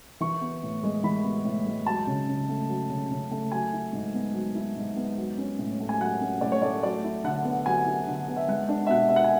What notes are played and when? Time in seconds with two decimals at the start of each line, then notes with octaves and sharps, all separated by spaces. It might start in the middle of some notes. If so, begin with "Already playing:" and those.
0.21 E3 C#6
0.41 B3
0.63 A2
0.83 G#3
1.03 E3 B5
1.24 B3
1.45 A2
1.66 G#3
1.86 F#3 A5
2.07 C#3
2.29 C#3
2.49 A3
2.69 F#3
2.90 C#3
3.11 C#3
3.31 A3
3.52 F#3 G#5
3.73 E4
3.93 G#2
4.14 B3
4.34 F#3
4.55 E4
4.76 G#2
4.96 B3
5.18 F#3
5.38 C#4
5.59 A2
5.80 A3
5.89 G#5
6.00 F#3 F#5
6.21 C#4
6.41 A2 D5
6.52 C#5
6.62 A3 D5
6.83 F#3 D5
7.04 E4
7.24 D3 F#5
7.45 B3
7.66 F#3 G#5
7.86 E4
8.07 D3
8.28 B3
8.37 E5
8.48 G#3 F#5
8.69 D4
8.87 E5
8.89 B2 F#5
9.09 B3 E5
9.16 F#5
9.24 G#5